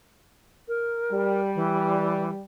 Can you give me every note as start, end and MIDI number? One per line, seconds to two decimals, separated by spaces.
0.68 1.41 70
1.12 2.44 55
1.55 2.30 52